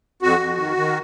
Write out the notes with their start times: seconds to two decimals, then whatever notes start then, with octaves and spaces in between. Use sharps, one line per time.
0.22 F2 F#4
0.39 F2
0.58 D#3
0.77 D#3